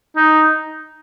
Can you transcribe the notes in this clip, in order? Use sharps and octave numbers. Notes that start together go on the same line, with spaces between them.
D#4